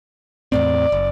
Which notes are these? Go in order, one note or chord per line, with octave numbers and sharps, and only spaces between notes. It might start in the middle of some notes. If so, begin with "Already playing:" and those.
E2 A2 C4 D5
F#1